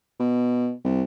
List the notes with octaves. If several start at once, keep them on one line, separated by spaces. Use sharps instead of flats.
B2
C2